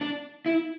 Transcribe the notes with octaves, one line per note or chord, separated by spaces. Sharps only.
D4
E4